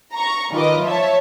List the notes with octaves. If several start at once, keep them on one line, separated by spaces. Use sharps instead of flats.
A#5 C#6
D#3 F4 B4 D#5 D6
F3 C#5 E5 A5